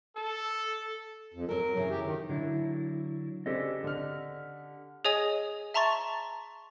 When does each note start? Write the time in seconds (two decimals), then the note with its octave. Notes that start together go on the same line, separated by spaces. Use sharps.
0.16 A4
1.34 F2
1.49 F#3 A4 A#4
1.76 F#2 C#3 E3
1.90 G4
2.03 D#3
2.29 D3 F#3 E4
3.46 C#3 C4 D4 G4 A4 D#5
3.84 D3 F6
5.05 G#4 C#5 D#5 G#5 D#6
5.74 E5 A5 A#5 C6 C#6 A6